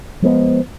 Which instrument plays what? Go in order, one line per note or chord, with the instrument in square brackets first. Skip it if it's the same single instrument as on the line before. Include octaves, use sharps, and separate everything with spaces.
[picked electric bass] F3 G#3 B3